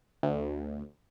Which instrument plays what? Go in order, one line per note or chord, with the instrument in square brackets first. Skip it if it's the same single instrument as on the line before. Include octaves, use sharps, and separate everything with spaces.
[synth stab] D2